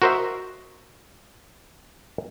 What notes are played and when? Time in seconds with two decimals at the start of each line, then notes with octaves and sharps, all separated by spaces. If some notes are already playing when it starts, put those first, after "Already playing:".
0.02 F#4 A#4 C5 D#5 E5